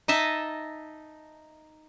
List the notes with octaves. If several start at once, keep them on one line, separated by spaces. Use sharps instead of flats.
D#4 D#5 E5 A5